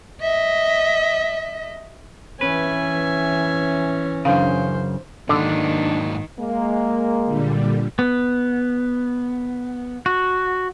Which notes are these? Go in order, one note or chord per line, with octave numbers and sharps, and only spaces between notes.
D#5 E5
E3 C#4 B4 E5 G#5
F#2 C#3 D4 C5 F5
G#2 D3 D#3 F#3 A#3 D4
G#3 A#3
A#2 D3 G3
B3
F#4